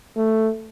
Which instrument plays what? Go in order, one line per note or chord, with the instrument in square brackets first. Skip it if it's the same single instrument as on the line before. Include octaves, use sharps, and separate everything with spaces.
[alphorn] A3